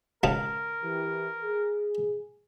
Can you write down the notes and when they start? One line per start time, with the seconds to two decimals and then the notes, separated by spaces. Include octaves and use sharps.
0.23 C#2 C#3 A#4 A5
0.82 E3 G4
1.42 G#4